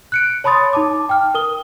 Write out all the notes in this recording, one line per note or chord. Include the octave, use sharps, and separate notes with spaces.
F#6 C#7 D7
C#5 A5 B5 C6 D#6 A6
D#4 A5 D6
G5 F6
A#4 D#6 G7